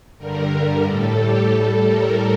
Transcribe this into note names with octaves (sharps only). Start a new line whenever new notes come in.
G2 D3 G3 A#4
A#4
A2 G3 A4
G4
A2 G3 A4
A#4